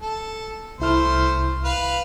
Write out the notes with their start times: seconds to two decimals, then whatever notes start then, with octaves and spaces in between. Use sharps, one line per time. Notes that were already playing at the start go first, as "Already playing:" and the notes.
0.01 A4
0.80 C2 A3 E4 C5 F6
1.64 B4 F5